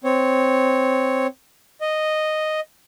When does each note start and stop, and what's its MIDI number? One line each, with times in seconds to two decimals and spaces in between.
0.04 1.27 60
0.04 1.27 73
1.81 2.60 75